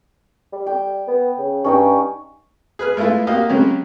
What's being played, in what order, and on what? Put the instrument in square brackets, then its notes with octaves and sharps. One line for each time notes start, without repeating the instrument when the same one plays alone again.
[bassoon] G3
[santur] G5
[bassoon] B3
C#3
[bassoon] G2 [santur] C#4 D#4 G5
[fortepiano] G#4 B4 F6
G#3 A3 B3 E4 F4
A#3 F#4 G4 D#5 F5
C#3 F#3 G#3 G4